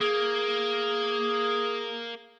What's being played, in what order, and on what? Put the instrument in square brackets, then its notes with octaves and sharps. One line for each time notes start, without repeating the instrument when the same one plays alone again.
[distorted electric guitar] A#3 [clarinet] G#4